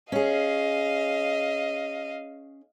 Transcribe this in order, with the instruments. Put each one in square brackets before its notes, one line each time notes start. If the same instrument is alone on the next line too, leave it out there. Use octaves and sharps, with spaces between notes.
[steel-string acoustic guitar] C#4 G#4 [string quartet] D#5 F5